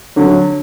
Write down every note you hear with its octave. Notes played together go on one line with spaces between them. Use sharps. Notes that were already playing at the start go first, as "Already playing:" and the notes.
D3 F#3